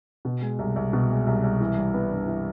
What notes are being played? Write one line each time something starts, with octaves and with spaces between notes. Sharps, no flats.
B2
G#3
C2
C2
B2
G#3
C2
C2
E3
G3
B3
G2
E3